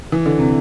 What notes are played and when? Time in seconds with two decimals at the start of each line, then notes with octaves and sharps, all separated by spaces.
0.12 E3
0.26 D3
0.39 C3